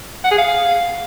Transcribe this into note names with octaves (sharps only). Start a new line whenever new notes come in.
F#5
G#4
F5